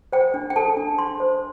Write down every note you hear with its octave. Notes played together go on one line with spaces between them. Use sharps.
C5 G5
D4
G5
A4 A5
D4
D4 C6
C5